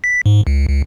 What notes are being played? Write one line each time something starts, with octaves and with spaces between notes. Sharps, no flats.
B6
G#2
C#2
C#2